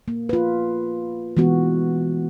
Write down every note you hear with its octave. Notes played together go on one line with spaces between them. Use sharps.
A#3
F4 B4
E3 G#3 B3 F#4